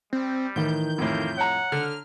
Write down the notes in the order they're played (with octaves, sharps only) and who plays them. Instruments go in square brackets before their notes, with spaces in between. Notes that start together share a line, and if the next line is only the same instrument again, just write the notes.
[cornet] G3 [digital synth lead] C4
[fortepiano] A2 [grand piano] D#3 E3 [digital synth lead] G6
[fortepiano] F2 A2 [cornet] A#3
[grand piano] C#5 A#5 [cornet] F#5
[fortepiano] D3 [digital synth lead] F6